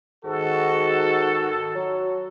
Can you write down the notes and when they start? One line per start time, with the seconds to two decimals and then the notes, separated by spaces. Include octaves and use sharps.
0.25 G#2 D#3 F#4 A4
1.75 F#3